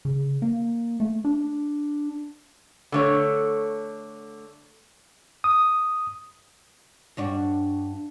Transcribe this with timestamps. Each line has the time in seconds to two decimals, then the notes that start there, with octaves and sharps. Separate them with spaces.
0.05 C#3
0.42 A#3
1.00 A3
1.25 D4
2.92 D3 A3 C#5
5.44 D#6
7.17 G2 D4 F#4